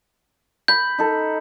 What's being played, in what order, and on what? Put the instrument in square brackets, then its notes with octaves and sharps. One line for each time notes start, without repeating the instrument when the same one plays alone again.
[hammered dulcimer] B5 [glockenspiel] G6
[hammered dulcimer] D#4 A4